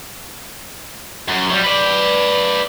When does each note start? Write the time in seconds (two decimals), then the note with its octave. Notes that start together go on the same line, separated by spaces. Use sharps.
1.28 F#2
1.51 F#3 G3
1.63 B4 D5